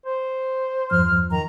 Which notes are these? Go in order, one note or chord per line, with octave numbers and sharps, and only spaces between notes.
C5
E2 G2 F3 F6
D#3 A#5